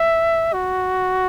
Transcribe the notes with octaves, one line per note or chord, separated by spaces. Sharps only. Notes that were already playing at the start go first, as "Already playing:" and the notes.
Already playing: E5
F#4